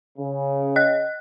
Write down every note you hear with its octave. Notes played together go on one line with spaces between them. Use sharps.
C#3
D#5 F#6